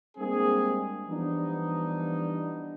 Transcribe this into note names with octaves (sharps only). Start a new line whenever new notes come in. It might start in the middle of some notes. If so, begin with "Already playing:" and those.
G3 G#3 A#3 C4 D4 G#4
E3 F3 G3 B3 D4 D#4